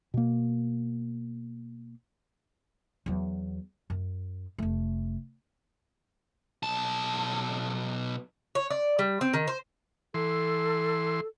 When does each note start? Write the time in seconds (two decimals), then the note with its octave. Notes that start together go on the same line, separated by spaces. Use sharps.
0.14 B2 A#3
3.06 E2 F#3
3.90 F#2
4.58 F1 A3
6.63 B1 A5
8.55 C#5
8.70 D5
8.99 G3
9.21 C4
9.34 D#3
9.47 C5
10.14 E3 A4 C6